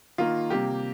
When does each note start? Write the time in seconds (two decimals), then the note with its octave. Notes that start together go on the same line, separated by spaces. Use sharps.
0.18 D#3 A#3 F4
0.50 C3 G3 A#3 G4